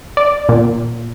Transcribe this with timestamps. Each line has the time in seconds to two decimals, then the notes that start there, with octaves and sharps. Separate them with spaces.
0.17 D5
0.49 A#2